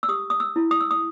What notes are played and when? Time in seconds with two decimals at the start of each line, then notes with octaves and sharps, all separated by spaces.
0.03 E6
0.09 G4 D#6
0.30 D#6
0.40 E6
0.56 E4
0.71 D#6
0.81 E6
0.91 D#6